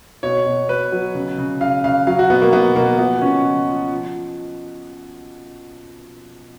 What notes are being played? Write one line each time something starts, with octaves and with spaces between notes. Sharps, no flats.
B2 C#5
B2
B2 B4
F#3
C#3
C#3
C#3 F5
C#3 F5
F#3 F5
F#4
B2 B3
A#3
B2 B3
B2 A#3
F3 B3
C#3 C#4
F3
F3
F3